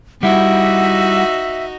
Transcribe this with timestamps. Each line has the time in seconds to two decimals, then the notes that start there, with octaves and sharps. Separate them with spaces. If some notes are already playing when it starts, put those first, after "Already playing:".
0.23 G3 D#4 E4 F#4 E5 F#5